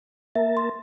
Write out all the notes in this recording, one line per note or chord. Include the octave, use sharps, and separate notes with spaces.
A#3 A#4 E5 A5
C6